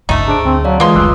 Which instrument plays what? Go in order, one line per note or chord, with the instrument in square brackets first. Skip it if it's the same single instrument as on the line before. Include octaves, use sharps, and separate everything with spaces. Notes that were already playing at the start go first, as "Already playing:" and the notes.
[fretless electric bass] G1 C#2 G2 [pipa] A3 D#4 [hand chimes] A6
[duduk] D4 [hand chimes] G#4 C5 D7
[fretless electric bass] D2 [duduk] C4
[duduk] F#3 [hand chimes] D5 F5 A5
[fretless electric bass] E3 [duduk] G#3 [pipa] A#3 C6 [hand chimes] F4 B4 D#6
[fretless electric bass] F#1 D2 G3 [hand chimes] D6 E6 F#6